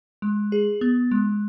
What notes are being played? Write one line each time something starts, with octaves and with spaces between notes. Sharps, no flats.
G#3
G#4
B3
G#3